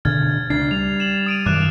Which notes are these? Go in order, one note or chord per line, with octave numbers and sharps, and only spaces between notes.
B2 D3 F6 G#6 A6
C#2 D4 A6 C7
G3 F7
E7 F#7
D#6 D7 D#7
F#2 D#3 D6 F#6 E7